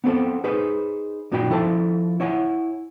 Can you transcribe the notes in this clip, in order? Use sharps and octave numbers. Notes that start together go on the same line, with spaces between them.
B3 C4 A4 C5
D#4 G#4 B4 C5
F#2 A#2 D#4 F#4 G5 B5
F3 E4 A4 C5 A5
E4 C#5 F#5 G#5